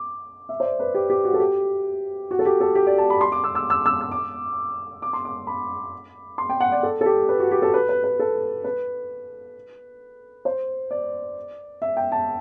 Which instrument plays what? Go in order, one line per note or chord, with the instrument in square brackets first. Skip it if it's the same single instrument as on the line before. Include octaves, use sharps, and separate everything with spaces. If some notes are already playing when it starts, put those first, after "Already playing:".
Already playing: [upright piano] D6
E5
C5
D5
B4
G4
G4
F#4
A4
G4
F#4
A4
G4
A4
G4
D5
A5
B5
C6
D6
E6
E6
E6
E6
E6
D6
D6
C6
D6
B5
C6
G5
F#5
D5
A4
A4
G4
B4
F#4
G4
A4
B4
B4
B4
A4
B4
C5
D5
E5
G5
A5